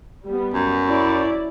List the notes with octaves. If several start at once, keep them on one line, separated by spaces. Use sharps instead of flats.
G3 B3
F#2
C#4 E4 D5